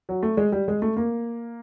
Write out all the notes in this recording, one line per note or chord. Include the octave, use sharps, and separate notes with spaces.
F#3
A3
G#3
G3
G#3
A3
A#3